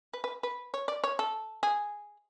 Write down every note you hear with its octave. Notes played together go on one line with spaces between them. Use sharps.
B4
B4
B4
C#5
D5
C#5
A4
G#4